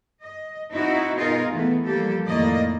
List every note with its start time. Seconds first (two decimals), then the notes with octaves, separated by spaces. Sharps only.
0.22 D#5
0.72 C4 D#4 E4 F#4
1.16 B2 D#4 F4 G#4 A#4
1.52 E3 A3 B3
1.84 F3 G3 A#3 G4 A4
2.27 F2 A2 D#3 A#3 D5 D#5